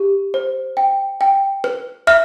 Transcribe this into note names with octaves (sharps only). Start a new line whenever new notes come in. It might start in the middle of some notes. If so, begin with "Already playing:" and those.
Already playing: G4
C5
G5
G5
B4
E5 F6